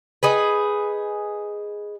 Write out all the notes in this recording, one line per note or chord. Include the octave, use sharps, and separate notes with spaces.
D#4 G#4 B4